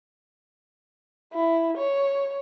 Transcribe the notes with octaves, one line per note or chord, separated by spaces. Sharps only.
E4
C#5